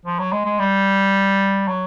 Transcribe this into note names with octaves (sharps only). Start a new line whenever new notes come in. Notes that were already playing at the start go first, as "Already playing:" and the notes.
F3
F#3
G#3
G#3
G3
F#3